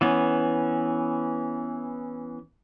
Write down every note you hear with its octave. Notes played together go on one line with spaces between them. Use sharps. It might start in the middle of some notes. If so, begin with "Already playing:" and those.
E3 B3 C#4